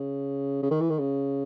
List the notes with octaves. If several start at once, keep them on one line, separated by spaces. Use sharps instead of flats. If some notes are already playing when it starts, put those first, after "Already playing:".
Already playing: C#3
C#3
D#3
E3
D#3
C#3